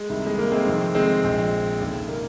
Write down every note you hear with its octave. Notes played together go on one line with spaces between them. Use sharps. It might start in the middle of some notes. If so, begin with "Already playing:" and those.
Already playing: G#3
C2 C3 D#3
G#3
A#3
G#3 C4
F1 F2 D#3
G#3 C4
A#1 A#2
F1 D#2 C#3
A#3